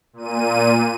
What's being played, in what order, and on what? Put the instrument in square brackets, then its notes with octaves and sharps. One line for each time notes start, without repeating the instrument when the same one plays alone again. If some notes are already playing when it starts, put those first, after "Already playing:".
[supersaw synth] A#2 D#7